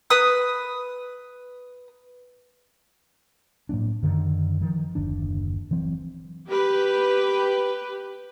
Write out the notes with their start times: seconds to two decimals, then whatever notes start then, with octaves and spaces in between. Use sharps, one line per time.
0.10 B4 D#6
3.69 A2 F#3 A#3 D4
4.02 F#2 D3 D#3
4.61 D#3 F3
4.95 F#1 D#2 D3 D4
5.71 E3 F#3 C4
6.48 G4 B4